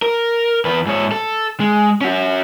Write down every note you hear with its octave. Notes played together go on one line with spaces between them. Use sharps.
A#4
E2 B4
G#2 C#5
A4
G#3
C#4 F#4